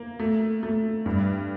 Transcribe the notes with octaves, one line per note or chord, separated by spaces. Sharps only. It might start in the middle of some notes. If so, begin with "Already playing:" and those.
Already playing: A#3
A3
A3
G2